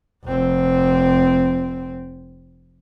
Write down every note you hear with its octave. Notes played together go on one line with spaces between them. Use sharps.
F1 C4